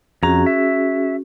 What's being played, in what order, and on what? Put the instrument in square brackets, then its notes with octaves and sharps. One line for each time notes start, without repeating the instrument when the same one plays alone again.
[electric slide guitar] F2 A#5 [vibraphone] C#4 F#4 G#4
[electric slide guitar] E5